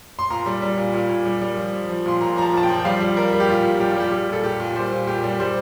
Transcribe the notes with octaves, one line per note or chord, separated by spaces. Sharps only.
C6
A#2 A#5
G3
G3
A#2
A#2
A#2
G3
G3
F3
F3
F3
A#2 C6
A#2 A#5
F3 A#5
A5
A#2 A5
G5
F3
G5
G3 F5
G3
G3 A#4
G3
G4
A#2 F4
A#2
G3 G4
F4
G3 G4
G3
A#2 A4
A#2 G4
A#2
G3 C5
A#2
A#2 G4
G3
G3 C5